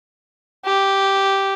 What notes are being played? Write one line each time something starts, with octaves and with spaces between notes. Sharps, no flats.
G4